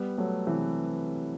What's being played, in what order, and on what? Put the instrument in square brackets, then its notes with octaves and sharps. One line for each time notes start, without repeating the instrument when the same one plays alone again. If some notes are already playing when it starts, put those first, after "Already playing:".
Already playing: [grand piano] G3 B3
F#3 A3
C3 E3